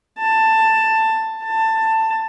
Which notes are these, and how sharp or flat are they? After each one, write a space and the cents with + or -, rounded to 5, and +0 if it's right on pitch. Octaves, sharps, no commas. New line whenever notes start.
A5 +10
A5 +15